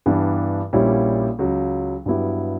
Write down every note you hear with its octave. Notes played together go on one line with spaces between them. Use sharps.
G2 E3 B3 D4 G4
A#1 A#2 G3 C#4 E4
C#2 C#3 F#3
G2 F#3 B3 E4 G4